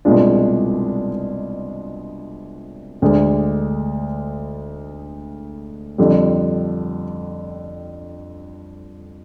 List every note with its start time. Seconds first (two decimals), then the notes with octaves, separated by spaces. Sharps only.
0.05 C2 B2 G#3 D4 F4
3.02 D2 D3 G#3
5.98 F2 D3 G3